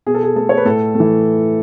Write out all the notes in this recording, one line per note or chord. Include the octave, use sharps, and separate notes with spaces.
B2 G#4
A4
G#4
A3 A4
C#5
B4
A2 A4
A3
E3